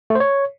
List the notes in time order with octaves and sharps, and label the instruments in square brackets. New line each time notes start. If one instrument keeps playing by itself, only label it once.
[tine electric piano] A3
C5
C#5